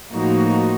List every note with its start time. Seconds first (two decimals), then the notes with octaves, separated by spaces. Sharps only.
0.12 A2 F3 A#3 D#4 F#4